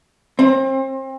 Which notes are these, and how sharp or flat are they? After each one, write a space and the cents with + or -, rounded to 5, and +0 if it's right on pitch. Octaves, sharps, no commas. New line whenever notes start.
C4 +35